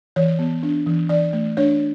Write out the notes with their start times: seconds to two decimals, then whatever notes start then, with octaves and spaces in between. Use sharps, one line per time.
0.16 E3 C#5
0.39 B3
0.63 D4
0.86 E3
1.09 E3 D5
1.33 A3
1.57 D4 C#5